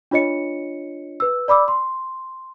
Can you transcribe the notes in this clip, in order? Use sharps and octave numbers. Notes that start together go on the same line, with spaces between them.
D4 F4 C#5 D#5 C#7
B4 E6
D5 B5 D6 E6
C6